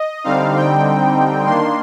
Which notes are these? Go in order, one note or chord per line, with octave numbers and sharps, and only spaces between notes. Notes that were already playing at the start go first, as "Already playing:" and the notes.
Already playing: D#5
D3 G3 C4 D#4 F5
G5
D#3 A#3 D4 C6